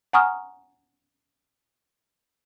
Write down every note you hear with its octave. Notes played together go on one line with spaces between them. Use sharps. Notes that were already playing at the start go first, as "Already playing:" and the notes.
F#5 G#5 A#5 C#6 D#6 F6